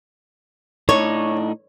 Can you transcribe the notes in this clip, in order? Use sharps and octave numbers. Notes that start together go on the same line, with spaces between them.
A2 D4 D#4 C#5